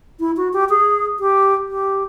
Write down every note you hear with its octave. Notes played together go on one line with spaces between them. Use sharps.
E4
F#4
G4
G#4
G4
G4